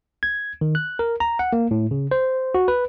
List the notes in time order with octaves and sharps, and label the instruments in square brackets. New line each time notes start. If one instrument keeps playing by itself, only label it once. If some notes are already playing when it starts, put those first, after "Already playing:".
[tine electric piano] G#6
D#3
F#6
A#4
A#5
F#5
A#3
A2
C#3
C5
F#4
B4